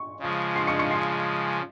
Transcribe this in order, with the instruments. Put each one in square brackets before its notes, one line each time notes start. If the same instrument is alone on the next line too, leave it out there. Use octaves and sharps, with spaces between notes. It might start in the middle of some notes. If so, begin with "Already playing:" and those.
Already playing: [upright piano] C#6
[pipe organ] C#3 F3 G#3
[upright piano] C6 C7
C#6 C#7
C#6 C#7
C6 C7